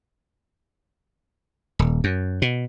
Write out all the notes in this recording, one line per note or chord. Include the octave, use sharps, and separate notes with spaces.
D#1
F#2
B2